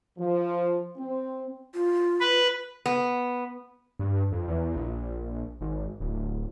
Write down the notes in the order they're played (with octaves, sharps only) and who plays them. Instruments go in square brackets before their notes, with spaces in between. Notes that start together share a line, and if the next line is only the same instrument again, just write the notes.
[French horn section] F3
C4
[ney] F4
[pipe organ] B4
[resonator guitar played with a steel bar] B3
[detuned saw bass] G2
F2
E2
A#1
G#1
D1